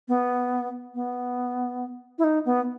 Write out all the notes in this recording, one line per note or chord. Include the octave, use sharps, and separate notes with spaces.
B3
B3
E4
D#4
B3